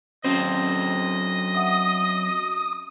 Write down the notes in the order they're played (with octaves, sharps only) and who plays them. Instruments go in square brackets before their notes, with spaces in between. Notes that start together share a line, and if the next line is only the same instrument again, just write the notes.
[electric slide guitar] F#3 C4 C5 [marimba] C#4 [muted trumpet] D#5
[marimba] E5 F#5 [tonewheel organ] D#6